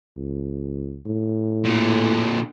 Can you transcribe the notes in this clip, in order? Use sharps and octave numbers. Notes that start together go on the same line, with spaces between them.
C#2
A2
A#2 D3